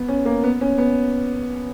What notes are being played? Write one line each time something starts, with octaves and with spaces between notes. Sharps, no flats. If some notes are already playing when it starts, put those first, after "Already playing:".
Already playing: B3
C#4
A#3
B3
C#4
B3